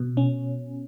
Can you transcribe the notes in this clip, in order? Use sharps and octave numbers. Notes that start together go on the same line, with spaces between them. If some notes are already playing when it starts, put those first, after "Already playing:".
Already playing: B2
C#4